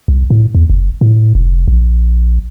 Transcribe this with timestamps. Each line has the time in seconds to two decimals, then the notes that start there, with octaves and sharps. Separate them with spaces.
0.08 C2
0.30 A2
0.55 E2
0.70 F#1
1.01 A2
1.35 F1
1.68 A#1